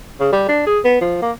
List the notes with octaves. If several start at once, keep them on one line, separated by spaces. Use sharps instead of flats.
C#3
G3
D4
G#4
B3
F3
A#3